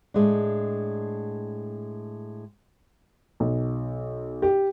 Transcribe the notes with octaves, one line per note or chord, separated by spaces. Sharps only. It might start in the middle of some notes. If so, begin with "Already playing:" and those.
A2 G#3 D4
B1
G4